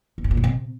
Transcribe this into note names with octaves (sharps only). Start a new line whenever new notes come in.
E2
A2
A#2
F#2
C3